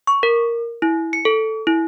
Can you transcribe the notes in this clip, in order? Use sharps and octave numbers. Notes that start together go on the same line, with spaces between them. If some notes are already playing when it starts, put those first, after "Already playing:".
C#6
A#4
E4
C#7
A4
E4